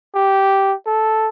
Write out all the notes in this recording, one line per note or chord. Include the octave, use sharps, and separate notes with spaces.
G4
A4